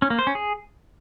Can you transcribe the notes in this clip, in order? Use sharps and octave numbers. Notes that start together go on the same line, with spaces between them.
C#4
A#3
C5
C#4
G#4